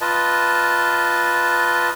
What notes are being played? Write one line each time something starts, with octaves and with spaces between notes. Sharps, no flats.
F4 B4 D#5 A5